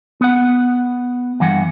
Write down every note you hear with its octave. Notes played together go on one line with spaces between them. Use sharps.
B3 F#5
G2 E3 F#5